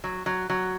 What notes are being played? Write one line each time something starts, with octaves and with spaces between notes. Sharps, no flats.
F#3
F#3
F#3